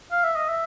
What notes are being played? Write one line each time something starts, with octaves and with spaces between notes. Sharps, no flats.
F5
E5
D#5
E5